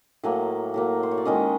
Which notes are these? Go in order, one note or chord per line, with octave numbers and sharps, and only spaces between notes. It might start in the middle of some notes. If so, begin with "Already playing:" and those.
A2 F#3 A#3 G#5
A2 F#3 A#3
C5
C#5
D5
D#3 G#3 C#4 D#5